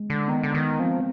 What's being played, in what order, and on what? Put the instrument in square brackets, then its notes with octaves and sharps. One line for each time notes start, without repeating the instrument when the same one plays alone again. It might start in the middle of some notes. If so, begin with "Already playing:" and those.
Already playing: [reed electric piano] G#3
[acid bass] D3
[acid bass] D#3 [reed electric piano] B3
[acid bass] D3
[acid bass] D#3 [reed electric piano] B3
[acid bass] F3 [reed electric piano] C4